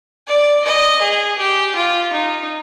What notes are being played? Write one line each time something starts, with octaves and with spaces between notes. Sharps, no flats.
D5
D#5
G#4
G4
F4
D#4